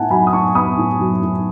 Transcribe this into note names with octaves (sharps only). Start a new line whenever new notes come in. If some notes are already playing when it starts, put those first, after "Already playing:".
Already playing: A2 B3 E5 F#5 G#5 A5
F#3 G#5 B5
D#6
A2 A5 C#6
B3 B5 D#6
A2
F#3
A2